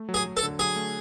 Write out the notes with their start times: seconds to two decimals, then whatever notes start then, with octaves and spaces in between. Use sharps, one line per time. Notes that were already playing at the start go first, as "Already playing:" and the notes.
Already playing: A3
0.09 F#3
0.14 G#4
0.26 F#3
0.37 A4
0.43 D3
0.59 F#3 G#4
0.76 A3